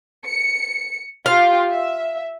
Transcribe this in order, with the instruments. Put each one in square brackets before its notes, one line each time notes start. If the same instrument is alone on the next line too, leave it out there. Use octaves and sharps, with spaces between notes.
[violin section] C#7
[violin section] F4 G4 [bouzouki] F5
[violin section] E5